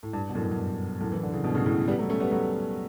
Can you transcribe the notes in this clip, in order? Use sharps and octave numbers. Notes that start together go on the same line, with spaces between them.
A2
G2
B2
F#2 A2
F#2
G2
F#2 A2
E3
D3
C#3
G2 B2
A2 C#3
A2 C#3
G3 B3
F#3 A3
A3 C#4
G3 B3
F#3 A3